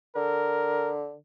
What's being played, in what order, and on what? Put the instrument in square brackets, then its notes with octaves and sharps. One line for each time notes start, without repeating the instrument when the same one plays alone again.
[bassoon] D3 [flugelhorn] A#4